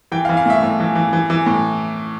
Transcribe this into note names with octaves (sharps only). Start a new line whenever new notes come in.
E3 G5
F5
E3
F5
A2 E5
A2
E3
E3
E3
E3
A2